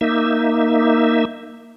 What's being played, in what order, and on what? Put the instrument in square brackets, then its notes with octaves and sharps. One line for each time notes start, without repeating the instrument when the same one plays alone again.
[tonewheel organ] A#3 D#4 E5